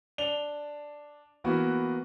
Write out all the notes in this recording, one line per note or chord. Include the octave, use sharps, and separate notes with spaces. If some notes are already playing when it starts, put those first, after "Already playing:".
D4 F7 G7
E3 A#3 B3 F#4